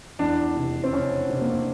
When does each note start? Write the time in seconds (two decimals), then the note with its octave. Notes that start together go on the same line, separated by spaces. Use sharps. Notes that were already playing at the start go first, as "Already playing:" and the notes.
0.19 E2 D4
0.56 F1
0.84 C4
0.93 C#3 C#4
1.30 F1
1.42 A#3